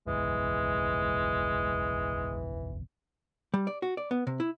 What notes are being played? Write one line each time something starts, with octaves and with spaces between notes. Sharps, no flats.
F#1 B1 E2 E3 G#3
G3
D5
F#4
D5
B3
C3
E4